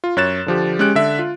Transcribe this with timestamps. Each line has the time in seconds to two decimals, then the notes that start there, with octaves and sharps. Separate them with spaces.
0.04 F4
0.17 F#2 C#5 F#6 A6 E7
0.46 D3 F3 G4
0.79 G#3 C#4 G4 F#6 D7
0.95 D3 E5
1.19 F4